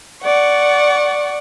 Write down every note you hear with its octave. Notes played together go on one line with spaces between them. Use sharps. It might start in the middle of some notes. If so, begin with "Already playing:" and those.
D5 F#5 C#6